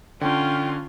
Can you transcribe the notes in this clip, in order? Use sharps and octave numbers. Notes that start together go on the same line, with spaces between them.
D3 C#4 F4 G5